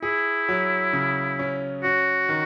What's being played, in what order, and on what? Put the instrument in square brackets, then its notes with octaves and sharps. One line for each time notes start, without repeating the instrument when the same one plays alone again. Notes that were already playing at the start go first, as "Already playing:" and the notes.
[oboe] E4 [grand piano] G#4
[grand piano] F#3
C#3
C#4
[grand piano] C#4 [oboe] F#4
[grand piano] D#3